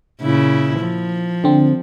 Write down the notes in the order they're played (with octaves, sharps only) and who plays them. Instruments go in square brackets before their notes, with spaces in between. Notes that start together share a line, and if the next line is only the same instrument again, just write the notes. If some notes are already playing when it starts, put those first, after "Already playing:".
[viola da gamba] A#2 C#3 E4
F3
[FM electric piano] D3 C4